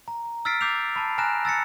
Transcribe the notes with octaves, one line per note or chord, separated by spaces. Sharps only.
A#5
E6 F6 A6 B6 C7 D7
D6 G6 C7 F7
A5 B5
G#5 A#5 F6 F#6 A#6 E7
E6 A6 A#6 C#7